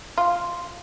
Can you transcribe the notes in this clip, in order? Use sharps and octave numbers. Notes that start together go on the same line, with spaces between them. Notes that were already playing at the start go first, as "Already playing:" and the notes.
F4